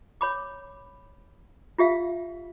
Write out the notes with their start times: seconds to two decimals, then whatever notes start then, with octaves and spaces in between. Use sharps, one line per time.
0.21 C#5 B5 D6
1.78 F4 G4 E5 F5